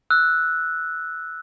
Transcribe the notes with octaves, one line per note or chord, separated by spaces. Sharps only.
E6 F#6